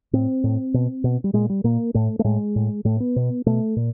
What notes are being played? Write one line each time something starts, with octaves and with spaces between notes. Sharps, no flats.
A2 C4
A2
B2
B2
G3
A#2 G#3
G3
A#2 A#3
A2 A3
A3
A2 G#3
A2
A2 A3
B3
B2
B2 A3
A#2